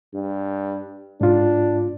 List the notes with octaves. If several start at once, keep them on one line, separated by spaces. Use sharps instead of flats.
G2
G#2 D4 F4